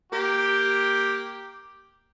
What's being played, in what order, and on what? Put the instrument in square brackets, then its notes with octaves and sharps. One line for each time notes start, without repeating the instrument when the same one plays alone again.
[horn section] A#3 G4